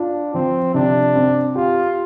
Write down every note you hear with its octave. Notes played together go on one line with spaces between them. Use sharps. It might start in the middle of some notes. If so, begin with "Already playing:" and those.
Already playing: D4 F4
F3 C4
C3 D4
C4
F4 G4